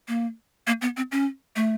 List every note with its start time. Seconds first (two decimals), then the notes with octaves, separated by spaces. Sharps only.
0.08 A#3
0.67 A#3
0.82 B3
0.97 C4
1.12 C#4
1.56 A3